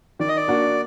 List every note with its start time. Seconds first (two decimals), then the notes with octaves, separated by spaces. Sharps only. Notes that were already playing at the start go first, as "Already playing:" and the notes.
0.19 D#3 D5
0.29 D#5
0.37 D5
0.48 A#3 D4 F#4